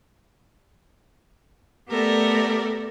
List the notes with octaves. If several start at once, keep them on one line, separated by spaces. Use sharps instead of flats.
A3 B3 G4 A4 A#4 D5